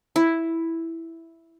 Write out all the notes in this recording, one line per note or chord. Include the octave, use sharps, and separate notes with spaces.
E4